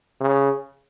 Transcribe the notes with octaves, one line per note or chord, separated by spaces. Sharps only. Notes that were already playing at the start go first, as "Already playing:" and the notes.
C#3